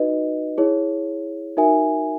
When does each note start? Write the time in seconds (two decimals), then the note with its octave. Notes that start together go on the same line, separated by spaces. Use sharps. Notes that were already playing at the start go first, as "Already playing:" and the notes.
Already playing: D#4 F#4 B4 D#5
0.58 E4 G#4 C#5
1.57 D#4 F#4 A#4 E5 G#5